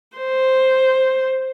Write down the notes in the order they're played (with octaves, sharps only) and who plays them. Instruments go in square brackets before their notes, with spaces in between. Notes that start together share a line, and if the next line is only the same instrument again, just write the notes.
[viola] C5